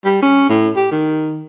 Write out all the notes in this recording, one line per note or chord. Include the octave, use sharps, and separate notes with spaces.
G3
C#4
A2
G4
D#3